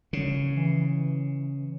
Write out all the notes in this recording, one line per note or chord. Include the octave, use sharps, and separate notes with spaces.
C#3
E3